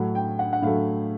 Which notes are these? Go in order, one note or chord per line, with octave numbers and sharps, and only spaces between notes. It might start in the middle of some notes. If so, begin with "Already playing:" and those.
Already playing: A2 F#3 A3 F#5
G5
F#5
F#5
A2 F#3 A3 F5